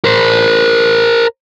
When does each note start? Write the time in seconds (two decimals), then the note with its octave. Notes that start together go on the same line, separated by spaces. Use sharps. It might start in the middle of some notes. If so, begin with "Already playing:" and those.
0.05 A#4 C5